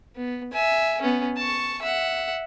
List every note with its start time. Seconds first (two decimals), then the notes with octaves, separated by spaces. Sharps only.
0.16 B3
0.53 E5 G#5
1.02 B3 C#4
1.37 A5 C#6
1.82 E5 F#5